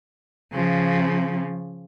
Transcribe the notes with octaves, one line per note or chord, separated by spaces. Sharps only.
C#3 F3